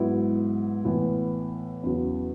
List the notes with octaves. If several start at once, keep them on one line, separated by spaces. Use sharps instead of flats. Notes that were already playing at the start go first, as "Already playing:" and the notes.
Already playing: G#2 F#3 B3 E4
A2 E3 B3
E2 C#3 F#3 B3